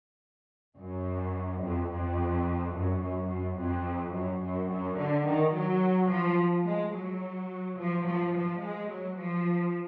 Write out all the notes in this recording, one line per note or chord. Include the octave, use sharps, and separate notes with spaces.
F#2
F2
F2
F#2
F#2
F#2
F2
F#2
F#2
F#2
D3
D#3
F#3
F3
G#3
F#3
F3
F3
F3
G#3
F#3
F3